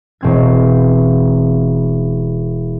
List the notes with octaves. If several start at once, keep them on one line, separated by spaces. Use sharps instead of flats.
E1 C4 G#6